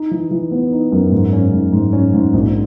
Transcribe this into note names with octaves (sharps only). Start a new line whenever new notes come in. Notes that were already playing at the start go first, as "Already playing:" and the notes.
Already playing: D#4
E3
E3
B3
D#4
F#2
G#2
C#4
G#2
G#2
C#4
G#2
A#1